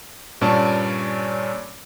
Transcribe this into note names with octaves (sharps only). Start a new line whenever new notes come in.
G2 A#2 C#4 D5 A5 C#6